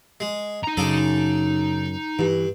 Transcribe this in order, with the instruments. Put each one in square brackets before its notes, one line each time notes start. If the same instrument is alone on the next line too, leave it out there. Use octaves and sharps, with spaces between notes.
[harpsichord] G#3
[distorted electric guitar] D#4 A#5
[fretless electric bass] F#2 [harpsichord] C#3 D4 A4
[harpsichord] G2 [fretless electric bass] E3